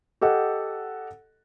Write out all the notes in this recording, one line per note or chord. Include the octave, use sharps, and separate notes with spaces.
G4 A4 D#5 F#5